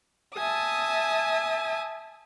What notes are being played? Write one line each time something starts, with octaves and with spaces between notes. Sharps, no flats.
E5 G#5 A5 D#6